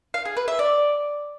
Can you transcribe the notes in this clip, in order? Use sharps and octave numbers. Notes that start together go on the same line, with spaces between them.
F5
G#4
B4
E5
D5